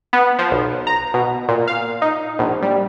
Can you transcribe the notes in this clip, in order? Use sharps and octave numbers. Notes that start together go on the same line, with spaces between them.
B3
F3
B1
A#5
B2
A#2
F5
D#4
A#1
G3